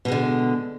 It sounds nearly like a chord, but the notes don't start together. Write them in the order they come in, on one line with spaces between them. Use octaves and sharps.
B2 G#3 D3